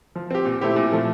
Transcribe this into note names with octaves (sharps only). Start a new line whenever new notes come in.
F3
C4 G4
A#2
A3 C4 E4 G4
A#2
F3 A3